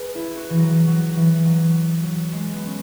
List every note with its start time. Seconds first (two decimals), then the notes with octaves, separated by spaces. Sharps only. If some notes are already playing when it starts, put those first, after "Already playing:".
Already playing: G#4 B4
0.15 E4
0.37 F#4
0.50 E3
0.58 F#3
0.87 F#3
1.16 E3
1.45 F#3
2.03 F#3
2.32 G#3
2.53 B3
2.66 C#4